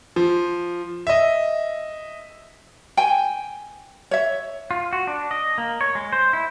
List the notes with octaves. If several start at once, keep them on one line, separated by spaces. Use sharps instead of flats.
F3
D#5 E5
G5 G#5
C#5 E5
F4
F#4
D4
D#5
A#3
C#5
G#3
C5
E4